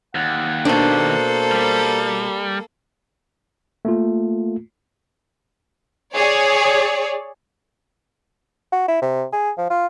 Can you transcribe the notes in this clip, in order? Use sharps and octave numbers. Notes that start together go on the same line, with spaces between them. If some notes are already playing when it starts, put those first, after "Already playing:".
D#2 F#5
B2 A#3 D4 A4 C5
G3
A3 A#3 F4
G#4 C#5 D5
F#4
E4
C3
G#4
F3
F4